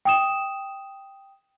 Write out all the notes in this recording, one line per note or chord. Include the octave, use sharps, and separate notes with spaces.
G5 D#6 E7